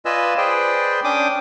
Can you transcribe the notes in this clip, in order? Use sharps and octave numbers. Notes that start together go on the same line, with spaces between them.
F4 B4 D5 D#5 G#5 E6
G#4 B4 C5 D5 G5
C#4 D4 G5 D6 D#6